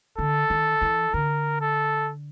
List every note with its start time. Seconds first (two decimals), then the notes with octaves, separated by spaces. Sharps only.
0.18 D3 A4
0.50 D#3
0.82 E3
1.14 D3 A#4
1.61 A4